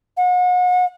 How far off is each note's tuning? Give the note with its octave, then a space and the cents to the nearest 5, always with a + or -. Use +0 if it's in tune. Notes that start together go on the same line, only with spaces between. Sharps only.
F#5 -40